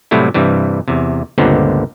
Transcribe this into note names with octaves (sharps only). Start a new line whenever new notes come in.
A2 C3 F#3 G3 A3 E4
G2 C3 E3 G3
E2 C3
C#2 G2 A#2 D3 B3 C4